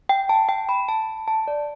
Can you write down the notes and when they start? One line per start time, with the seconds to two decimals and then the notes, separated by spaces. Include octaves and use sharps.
0.09 G5
0.29 A5
0.49 G5
0.69 B5
0.89 A5
1.28 A5
1.48 D5